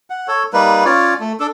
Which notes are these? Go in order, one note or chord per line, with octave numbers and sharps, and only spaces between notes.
F#5
A4 C#5
G3 A#3 D#4 B4
C#4 F4 C#5 D5
A3
D4 A4